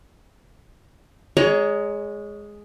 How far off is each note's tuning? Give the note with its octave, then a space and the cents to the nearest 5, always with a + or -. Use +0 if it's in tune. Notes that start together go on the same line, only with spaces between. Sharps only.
G#3 +0 C#5 +30 A#5 +10